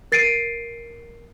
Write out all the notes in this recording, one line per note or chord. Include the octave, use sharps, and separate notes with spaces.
A#4 A6 C7 D7 D#7